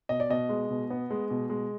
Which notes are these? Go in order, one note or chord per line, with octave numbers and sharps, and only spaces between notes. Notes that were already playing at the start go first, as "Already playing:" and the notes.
B2 D#5
D5
B2 D#5
G#3
B2
B3
G#3
B2
G#3